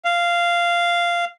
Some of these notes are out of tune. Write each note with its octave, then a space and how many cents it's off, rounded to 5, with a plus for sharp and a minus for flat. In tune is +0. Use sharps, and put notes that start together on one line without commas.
F5 -10